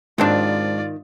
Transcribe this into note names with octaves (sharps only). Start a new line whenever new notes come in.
G#2 D#3 F#3 C4 D4 F4 D5